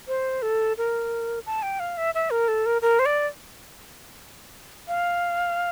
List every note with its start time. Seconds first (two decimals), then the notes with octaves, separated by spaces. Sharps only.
0.08 C5
0.42 A4
0.78 A#4
1.46 A5
1.63 G5
1.80 F5
1.97 E5
2.15 E5
2.31 A#4
2.48 A4
2.66 A#4
2.82 A#4
2.99 C5
3.06 D5
4.88 F5